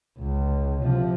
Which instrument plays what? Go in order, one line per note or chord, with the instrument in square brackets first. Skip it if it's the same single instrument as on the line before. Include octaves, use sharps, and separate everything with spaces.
[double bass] C#2
C3 F3